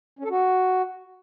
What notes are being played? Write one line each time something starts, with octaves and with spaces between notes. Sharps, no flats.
C#4
A4
F#4